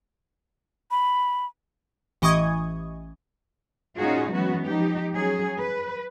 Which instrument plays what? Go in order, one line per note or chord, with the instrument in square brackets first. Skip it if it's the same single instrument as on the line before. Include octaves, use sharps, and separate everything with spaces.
[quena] B5
[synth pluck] A1 E3 D#5 C#6 D#6 G#6
[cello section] A#2 C#4 D#4 F4 F#4 G#4
E3 F#3 G#3 B3 C#4 F#4
F3 D#4 G4
F#3 C#4 G#4
B4